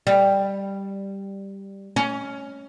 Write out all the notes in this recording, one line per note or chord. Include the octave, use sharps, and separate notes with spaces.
G3
C#4